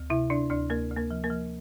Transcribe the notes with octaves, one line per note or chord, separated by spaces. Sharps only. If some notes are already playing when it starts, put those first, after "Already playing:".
Already playing: D2
C3 E4 E5
C3 D4 D5
D2 D4 D5
D2 A#3 A#4
D2
A#3 A#4
F3
A#3 A#4
F3